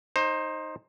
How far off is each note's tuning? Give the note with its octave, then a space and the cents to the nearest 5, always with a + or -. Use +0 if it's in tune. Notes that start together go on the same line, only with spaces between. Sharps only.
D#4 +0 C5 +20